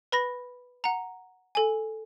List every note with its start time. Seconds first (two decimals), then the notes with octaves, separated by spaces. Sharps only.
0.12 B4 B5 A#6
0.84 F#5 A#5
1.55 A4 G#5